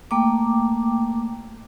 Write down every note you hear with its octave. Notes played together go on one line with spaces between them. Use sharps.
A3 A#3 G5 D6